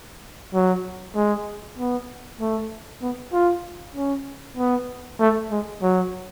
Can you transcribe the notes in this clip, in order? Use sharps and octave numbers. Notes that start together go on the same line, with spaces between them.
F#3
G#3
B3
A3
B3
F4
C#4
B3
A3
G#3
F#3